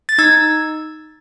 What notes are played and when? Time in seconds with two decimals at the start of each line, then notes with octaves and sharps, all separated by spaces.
0.09 A6
0.18 D#4 E6 G#6